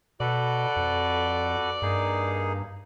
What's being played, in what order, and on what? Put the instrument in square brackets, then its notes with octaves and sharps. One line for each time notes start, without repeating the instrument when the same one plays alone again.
[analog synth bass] B2 [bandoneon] F#4 A4 B4 [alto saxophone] D5
[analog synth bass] F2
[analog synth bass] G2 [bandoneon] A#3 D#4 G#4